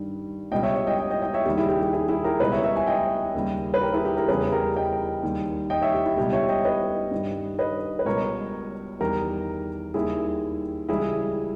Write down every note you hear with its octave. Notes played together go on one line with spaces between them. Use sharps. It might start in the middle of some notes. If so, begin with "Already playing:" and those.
Already playing: G2 D#3 G3
C#2 B2 G3 D#5 G5
C#5 E5
C#5 E5
D#5 G5
D#5 G5
D#5 G5
D#5 G5
C#5 E5
D#2 D#3 G3 G4
E4 G#4
G4
G4
E4 G#4
E4 G#4
G4 A#4
C#2 B2 G3 B4 D#5
C#5 E5
C#5 E5
E5 G#5
D#5 G5
D#2 C#3 G3
B4
G4 A#4
E4 G#4
G4 A#4
G4 A#4
E2 C#3 E3 G3 G#4 B4
G4 A#4
D#5 G5
D#2 D#3 G3
D#5 G5
C#5 E5
G4
E4
C#2 B2 G3 G4
C#5 E5
D#5 G5
B4 D#5
G2 D#3 G3
B4 D#5
B4
C#2 B2 G3 A#4 C#5
E2 D#3 G3 G4 A#4
D#2 D#3 G3 E4 G#4
C#2 C#3 E3 G3 E4 G#4